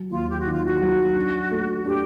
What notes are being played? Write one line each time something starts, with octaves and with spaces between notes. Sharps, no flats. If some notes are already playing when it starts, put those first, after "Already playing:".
Already playing: F#3
D#2 F4
G4
F#4
D#3
F4
F#4
F#3
D4
A3
D4 G4